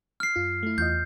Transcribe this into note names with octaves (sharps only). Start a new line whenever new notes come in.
F6 C7
F#2 F4
A3 E4
E2 F4 D#5 G6